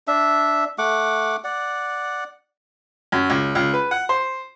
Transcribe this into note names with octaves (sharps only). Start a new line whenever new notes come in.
D4 E5
A3 F#5 D6
D5 F#5
F#2
C#2
C#2
B4
F#5
C5